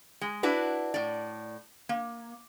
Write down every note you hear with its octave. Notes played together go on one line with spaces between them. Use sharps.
G#3
D4 E4 F#4 B4
A2 D5
A#3